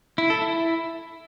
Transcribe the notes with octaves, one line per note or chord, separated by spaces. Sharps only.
E4
A4
E4